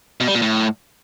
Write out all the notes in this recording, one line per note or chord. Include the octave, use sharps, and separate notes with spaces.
B2
G3
A#2
A2